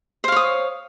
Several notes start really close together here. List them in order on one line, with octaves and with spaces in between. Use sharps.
C5 F5 C#5 D#6